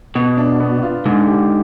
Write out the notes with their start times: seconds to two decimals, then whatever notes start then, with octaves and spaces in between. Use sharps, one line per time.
0.15 B2 B3
0.37 D4
0.60 B3
0.83 F4
1.05 G#2 D3
1.27 G4